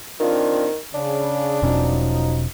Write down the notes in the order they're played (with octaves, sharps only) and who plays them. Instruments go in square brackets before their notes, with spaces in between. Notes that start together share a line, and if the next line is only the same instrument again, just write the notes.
[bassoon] D#3 [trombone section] C4 D4 F4
[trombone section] C#3 [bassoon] D4
[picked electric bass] E1 B2 C#4 [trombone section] F3 F#3 D#4